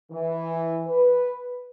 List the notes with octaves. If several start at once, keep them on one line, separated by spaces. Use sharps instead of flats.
E3
B4